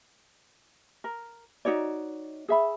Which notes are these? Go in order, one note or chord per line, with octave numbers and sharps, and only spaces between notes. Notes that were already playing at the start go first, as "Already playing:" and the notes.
A#4
D#4 F#4 C#5 D5
G#4 E5 B5